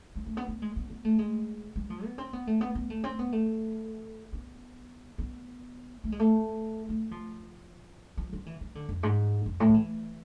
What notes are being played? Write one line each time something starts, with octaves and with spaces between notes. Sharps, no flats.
G#3
A3
B3
B3
G#3
B3
B3
A3
G#3
G#3
F3
B3
C4
B3
A3
B3
B3
A3
C4
B3
A3
B3
B3
A3
G#3
A3
A3
F3
F3
F3
E3
E3
D3
F2
G#2
F2
A2
F3
E3